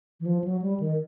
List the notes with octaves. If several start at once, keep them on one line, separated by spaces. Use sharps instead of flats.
E3
F3
F#3
G3
D#3